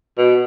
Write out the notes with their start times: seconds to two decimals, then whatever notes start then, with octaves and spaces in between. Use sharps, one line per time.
0.18 B2